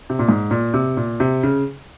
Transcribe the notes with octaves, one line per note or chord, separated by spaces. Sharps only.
C3
A#2
G#2
A#2
C3
A#2
C3
C#3